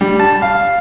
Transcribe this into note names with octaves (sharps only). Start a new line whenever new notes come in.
G3
A5
F5